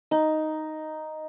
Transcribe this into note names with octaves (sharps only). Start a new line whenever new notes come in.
D#4